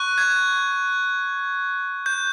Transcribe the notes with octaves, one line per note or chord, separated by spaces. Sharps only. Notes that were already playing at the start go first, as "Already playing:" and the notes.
Already playing: C#6 F#6
G#6
G6